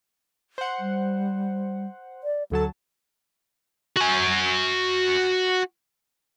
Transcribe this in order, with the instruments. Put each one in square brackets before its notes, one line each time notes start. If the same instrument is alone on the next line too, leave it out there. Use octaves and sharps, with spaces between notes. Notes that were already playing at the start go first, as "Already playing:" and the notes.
[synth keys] C5 F#5
[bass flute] G3
D5
[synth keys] D2 F#3 A5 [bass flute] A4
[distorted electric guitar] F#4 G#5